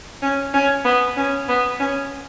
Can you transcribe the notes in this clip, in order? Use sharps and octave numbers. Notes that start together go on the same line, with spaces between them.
C#4
C#4
B3
C#4
B3
C#4